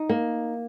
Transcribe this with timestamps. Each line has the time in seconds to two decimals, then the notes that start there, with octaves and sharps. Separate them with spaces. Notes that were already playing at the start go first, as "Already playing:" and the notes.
Already playing: D#4
0.09 A#3